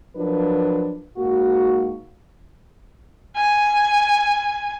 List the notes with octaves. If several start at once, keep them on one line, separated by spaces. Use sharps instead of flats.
F3 F#3 D4 A#4 B4
G#2 A#3 F#4
G#5